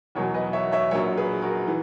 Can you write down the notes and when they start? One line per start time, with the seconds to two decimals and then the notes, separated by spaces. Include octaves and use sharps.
0.15 E2 B2 F#3 A#4 C#5
0.34 B4 D#5
0.53 C#5 E5
0.72 C#5 E5
0.91 A#1 A#2 F#3 A#4 C#5
1.17 G#4 B4
1.42 F#4 A#4
1.67 E3